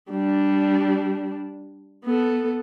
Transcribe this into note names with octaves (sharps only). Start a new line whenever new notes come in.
G3 D4
B3 A4